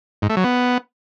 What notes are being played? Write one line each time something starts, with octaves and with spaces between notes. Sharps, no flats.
G#2
A3
F#3
B3